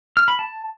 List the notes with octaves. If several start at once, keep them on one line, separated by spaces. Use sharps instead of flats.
F6
B5
A5